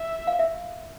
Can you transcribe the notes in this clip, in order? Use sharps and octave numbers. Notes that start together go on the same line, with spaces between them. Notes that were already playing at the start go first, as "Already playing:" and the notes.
Already playing: E5
F5
E5